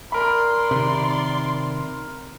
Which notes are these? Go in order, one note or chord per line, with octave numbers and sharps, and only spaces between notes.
A#4 D5 B5 C6
C3 D#3